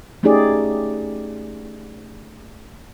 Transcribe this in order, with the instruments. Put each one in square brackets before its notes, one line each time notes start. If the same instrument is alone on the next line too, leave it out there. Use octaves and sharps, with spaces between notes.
[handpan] A3 C#4 D#4 G4 G#4 D5